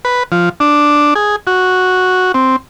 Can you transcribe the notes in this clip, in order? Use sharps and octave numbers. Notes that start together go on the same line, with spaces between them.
B4
F3
D4
G#4
F#4
C4